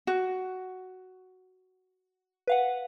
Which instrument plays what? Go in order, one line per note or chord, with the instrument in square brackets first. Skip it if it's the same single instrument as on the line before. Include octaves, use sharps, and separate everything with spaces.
[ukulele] F#4
[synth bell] B4 F5 F#5